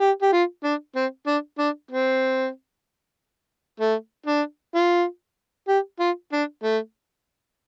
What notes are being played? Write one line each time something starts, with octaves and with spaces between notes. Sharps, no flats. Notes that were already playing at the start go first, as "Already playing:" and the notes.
G4
G4
F4
D4
C4
D4
D4
C4
A3
D4
F4
G4
F4
D4
A3